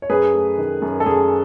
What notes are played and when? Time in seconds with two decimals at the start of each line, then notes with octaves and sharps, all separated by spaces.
0.02 C#5
0.10 F#2 G#4 B4
0.34 A3
0.58 D#3
0.82 F#2
1.00 A4
1.06 F#2 G#4